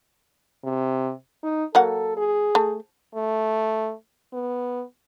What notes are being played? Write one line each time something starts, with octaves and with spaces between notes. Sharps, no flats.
C3
D#4
F#3 A#3 A4 F#5
G#4
A3
A3
B3